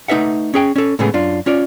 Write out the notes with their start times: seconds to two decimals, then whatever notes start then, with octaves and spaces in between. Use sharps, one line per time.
0.08 A3 D#4 B4 E5 F#5
0.54 C#4 G#4 G5
0.76 C#4 A4
0.99 A2 C#3 G#3 A3 B3 G#4
1.14 F#2 D4 F4
1.46 C#4 F4 C#5 D5